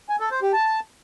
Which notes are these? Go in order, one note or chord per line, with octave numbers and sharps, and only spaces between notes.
G#5
A4
C5
G4
A5